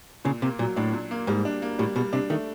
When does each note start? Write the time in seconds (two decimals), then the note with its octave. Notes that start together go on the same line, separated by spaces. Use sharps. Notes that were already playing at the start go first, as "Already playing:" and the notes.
0.25 A#2 C#3
0.42 C3 A#3
0.59 A#2 F#3
0.76 A2 D4
0.93 A#2
1.11 A#3
1.27 G#2 G3
1.45 D4
1.62 A#3
1.79 A2 G3
1.96 B2 G3
2.13 C3 D4
2.30 D#3 A3